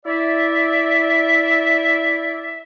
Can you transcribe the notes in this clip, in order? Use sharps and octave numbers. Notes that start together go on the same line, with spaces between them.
E4 D5 E5